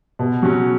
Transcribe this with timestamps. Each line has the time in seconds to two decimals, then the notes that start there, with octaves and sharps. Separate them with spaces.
0.19 B2
0.42 F#3 C#4